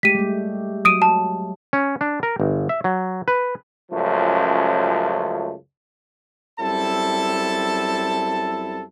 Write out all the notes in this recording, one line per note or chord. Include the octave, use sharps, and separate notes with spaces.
G#3 A3 G4 B6 D#7
G3 A3
F#3 D#6 D7 D#7
A5
C#4
D4
A#4
G1
E5
F#3
B4
C#2 F#2 F3 A3
F#2 G3 C4 E4 A4 A5